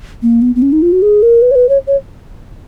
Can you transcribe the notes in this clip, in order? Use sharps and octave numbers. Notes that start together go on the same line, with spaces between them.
A#3
B3
B3
C#4
D#4
F4
F#4
G#4
A#4
B4
C#5
B4
C#5
C#5